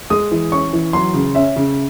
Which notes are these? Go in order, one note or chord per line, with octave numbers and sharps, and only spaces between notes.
G#3 D#6
E3
C#4 C#6
E3
F#3 C6
C#3
C#4 E5
C#3